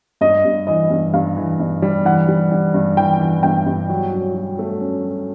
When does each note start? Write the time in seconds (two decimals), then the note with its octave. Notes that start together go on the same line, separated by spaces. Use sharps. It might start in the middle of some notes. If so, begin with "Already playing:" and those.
0.21 G2 D#5
0.45 G2
0.67 E3 D#5
0.91 G2
1.14 G2 F5
1.37 E3
1.59 G2
1.82 G3
2.05 E3 F#5
2.29 G3
2.52 G3
2.74 G2
2.97 E3 G5
3.20 E3
3.43 G2 G5
3.66 G2
3.89 F#3
4.13 F#3
4.35 F#3
4.59 A3
4.81 C#4
5.04 F#3